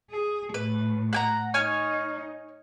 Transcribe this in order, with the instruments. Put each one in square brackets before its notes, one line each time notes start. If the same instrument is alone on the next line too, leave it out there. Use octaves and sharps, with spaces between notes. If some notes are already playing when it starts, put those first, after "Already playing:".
[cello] G#4
[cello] A2 [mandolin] B4
[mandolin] F#5 G#5 A#5
[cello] D#4 [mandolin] C#5 G#5 F6